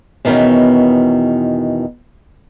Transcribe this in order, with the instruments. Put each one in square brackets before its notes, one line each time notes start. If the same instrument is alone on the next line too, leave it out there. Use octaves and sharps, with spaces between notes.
[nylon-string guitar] E2 B2 D#3 B3 C#4